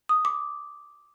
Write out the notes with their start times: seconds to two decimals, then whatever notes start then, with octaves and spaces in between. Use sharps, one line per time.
0.09 D#6
0.25 D6